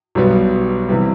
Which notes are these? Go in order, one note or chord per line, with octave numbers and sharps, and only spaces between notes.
B1 B2 G3 B3
C3 E3 G3